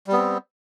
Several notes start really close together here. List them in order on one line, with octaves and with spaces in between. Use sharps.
G3 B3 C4